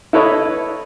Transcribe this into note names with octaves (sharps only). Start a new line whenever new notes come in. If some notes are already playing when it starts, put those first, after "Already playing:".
E4 A4 B4 C#5 D#5